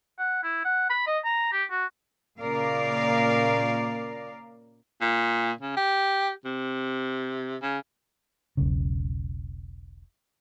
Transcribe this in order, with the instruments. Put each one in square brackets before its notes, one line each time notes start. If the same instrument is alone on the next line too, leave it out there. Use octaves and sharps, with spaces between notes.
[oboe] F#5
E4
F#5
B5
D#5
A#5
G4
F#4
[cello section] A#2 C#3 A#4 D5 F5
[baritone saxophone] A#2
C#3
G4
C3
C#3
[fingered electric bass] E1 B1 C#3